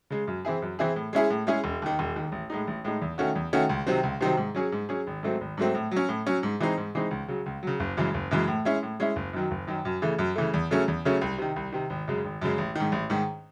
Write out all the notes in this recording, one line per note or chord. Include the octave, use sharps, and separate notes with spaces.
C#3 G#3
F#2
E3 C4 E4 G#4
F#2
E3 C4 E4 G#4
A2
G#3 C#4 E4 G#4
A2
G#3 C#4 E4 G#4
E1
D#2 D#3
E1
D#2 D#3
A1
A2 G#3 D#4
A1
A2 G#3 D#4
E2
D#3 A3 C#4 F#4
E2
D#3 A3 C#4 F#4
C#2
C3 D#3 F#3 C4
C#2
C3 D#3 F#3 C4
G#2
F#3 C#4 G#4
G#2
F#3 C#4 G#4
G#1
G#2 F#3 A3 C4
G#1
G#2 F#3 A3 C4
A2
F#3
C#4
A2
F#3 C#4
G#2
E3 G#3 C4 D#4
G#2
E3 G#3 C4 D#4
C#2
C#3 F#3
C#2
C#3 F#3
F#1
F#2 C#3 E3 G#3
F#1
F#2 C#3 E3 G#3
A2
G#3 C#4 E4
A2
G#3 C#4 E4
F#1
F#2 D#3 F#3
F#1
F#2 D#3 F#3
F#2
C#3 E3 A3
F#2
C#3 E3 A3
E2
C#3 F#3 A3 C#4
E2
C#3 F#3 A3 C#4
C2
C3 D#3
C2
C3 D#3
G#1
F#2 C#3 G#3
G#1
F#2 C#3 G#3
A1
G#2 D#3
A1
G#2 D#3